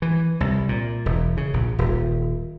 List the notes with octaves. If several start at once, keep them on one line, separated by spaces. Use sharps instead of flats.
E3
C2
A#2
E1
C#3
A#1
D#1